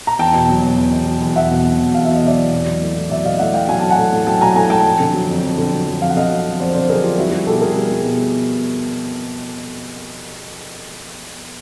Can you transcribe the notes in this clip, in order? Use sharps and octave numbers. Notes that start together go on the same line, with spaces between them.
A#5
E2 G5 A5
B2
F#3
E2
E2
B2
F#3
E2
E2 E5 F#5
B2
F#3
E2
E2 F5
B2 E5
D#5
F#3 D5 E5
E2
F#3
F#3
A2
A2
F#3 D5 E5
F#3 D#5 F5
A2 E5 F#5
A2 F5 G5
F#3 G#5
F#3 A5
F#5 G#5
A2
A2
F#3 G5 A5
F#3 G#5 A#5
A2 G#5 A#5
A2 G5 A5
F2
D3
F#3
F2
F2
D3
F#3
F2
F2 F5
F#5
D3 D#5 F5
F#3
F2
F2 C5 D5
D3 C5 D5
F#3 G#4 A#4
F2 F4 G4
G3 E4 F#4
G3 F#4 G#4
B2 G4 A4
B2 G#4 A#4
G3
G3
B2